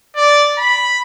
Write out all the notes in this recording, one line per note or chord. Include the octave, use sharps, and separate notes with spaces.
D5
B5